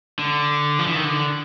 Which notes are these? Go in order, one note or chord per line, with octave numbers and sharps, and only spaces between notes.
D3
F3
E3
D#3
D3